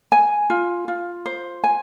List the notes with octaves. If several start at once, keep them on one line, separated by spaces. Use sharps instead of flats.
G#5
F4
F4
C5
G#5